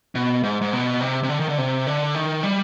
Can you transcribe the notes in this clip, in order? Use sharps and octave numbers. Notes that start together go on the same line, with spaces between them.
B2
G#2
G#2
B2
C3
C3
D3
D#3
D3
C3
D3
D#3
G3